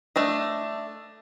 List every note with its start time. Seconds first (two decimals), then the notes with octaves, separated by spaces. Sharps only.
0.16 A3 D4 D#5